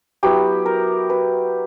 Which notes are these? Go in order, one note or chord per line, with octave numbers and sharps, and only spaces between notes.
F#3 B3 E4 G4
A#4
B4